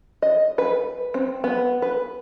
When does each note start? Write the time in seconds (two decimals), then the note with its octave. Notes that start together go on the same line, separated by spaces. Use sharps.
0.22 D#5
0.58 B4
1.14 C4
1.44 B3
1.82 B4